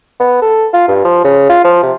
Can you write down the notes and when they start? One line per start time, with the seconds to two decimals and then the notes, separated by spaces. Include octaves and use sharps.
0.20 B3
0.42 A4
0.74 F4
0.88 G2
1.05 F3
1.24 C#3
1.49 F4
1.65 F3
1.83 C3